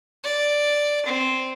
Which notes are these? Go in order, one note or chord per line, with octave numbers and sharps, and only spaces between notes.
D5
C4